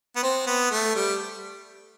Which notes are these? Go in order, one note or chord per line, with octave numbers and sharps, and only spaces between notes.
B3
C4
B3
A3
G3